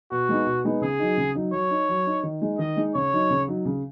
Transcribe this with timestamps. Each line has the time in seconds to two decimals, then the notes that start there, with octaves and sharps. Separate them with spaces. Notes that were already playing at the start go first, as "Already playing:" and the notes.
0.11 B2 F#4
0.29 G#3 B3 D#4
0.46 B2
0.65 G#3 B3 D#4
0.81 C#3 G#4
0.99 F#3 D#4
1.18 C#3
1.35 F#3 D#4
1.53 F#3 C#5
1.71 D#4
1.89 F#3
2.07 D#4
2.23 D#3
2.42 G#3 D#4
2.59 D#3 D#5
2.77 G#3 D#4
2.95 C#3 C#5
3.13 F#3 D#4
3.30 C#3
3.48 F#3 D#4
3.65 C#3